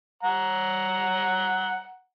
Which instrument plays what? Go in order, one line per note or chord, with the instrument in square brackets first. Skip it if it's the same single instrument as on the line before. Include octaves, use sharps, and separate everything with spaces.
[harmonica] F#5 A#5